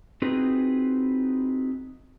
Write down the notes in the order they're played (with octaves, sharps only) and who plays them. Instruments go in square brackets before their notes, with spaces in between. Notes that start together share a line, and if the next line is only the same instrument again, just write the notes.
[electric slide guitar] C4 D#4 F4 F#4 G#4 B4